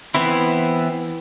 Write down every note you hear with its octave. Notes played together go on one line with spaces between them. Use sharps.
E3 B3 C4 E4